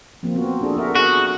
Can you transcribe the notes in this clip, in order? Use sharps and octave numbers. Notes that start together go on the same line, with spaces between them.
F3 A#3 C4
B3 C4 F#4
D4 G#4 A4
F#4 A#4 E5
F#4 G#4